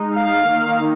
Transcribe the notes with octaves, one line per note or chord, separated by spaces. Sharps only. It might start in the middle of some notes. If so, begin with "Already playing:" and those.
Already playing: G#3 D#4
F5
D#3 A#3 D#4